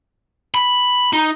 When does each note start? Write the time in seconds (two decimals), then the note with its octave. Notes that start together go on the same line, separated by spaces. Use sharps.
0.54 B5
1.13 D#4